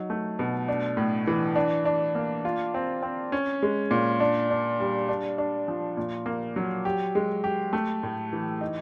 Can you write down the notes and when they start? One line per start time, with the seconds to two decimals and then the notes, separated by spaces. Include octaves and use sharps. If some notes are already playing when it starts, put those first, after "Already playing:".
Already playing: F#3 D#4
0.10 A3
0.39 B2
0.68 D4
0.97 A2
1.27 E3
1.56 D4
1.85 D4
2.15 A#3
2.45 F4
2.74 C4
3.03 C4
3.32 C#4
3.63 G#3
3.91 A#2
4.20 D4
4.50 D4
4.80 G3
5.09 D4
5.38 D4
5.68 F3
5.97 A#2
6.26 A#3
6.56 F#3
6.85 G4
7.15 G#3
7.44 G4
7.73 A3
8.03 A2
8.33 E3
8.61 D#4